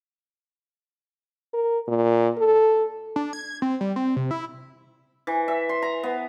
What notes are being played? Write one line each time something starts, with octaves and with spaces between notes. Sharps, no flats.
A#4
A#2
A4
D4
G#6
C4
G3
C4
C3
E4
E3
E5
C6
A#5
B3